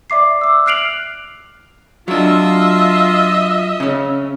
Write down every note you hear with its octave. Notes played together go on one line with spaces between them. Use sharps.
D5 E5 D6 C7
D6 E6
F6 F#6 C7 D7 F7 F#7
F#3 D4 F4 D#5 E5
C#3 C#4